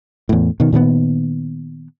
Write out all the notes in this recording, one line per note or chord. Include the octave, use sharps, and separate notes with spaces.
E2 A2
B2 D#3
A#2 D#3 F3 B3